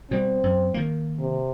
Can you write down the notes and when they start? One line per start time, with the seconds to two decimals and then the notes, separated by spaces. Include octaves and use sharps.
0.11 B2 G3 C4
0.43 F#2
0.74 D#3 A#3
1.19 C3